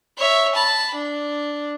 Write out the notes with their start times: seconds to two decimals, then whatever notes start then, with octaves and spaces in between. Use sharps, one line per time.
0.17 C#5 E5
0.54 A5 B5
0.94 D4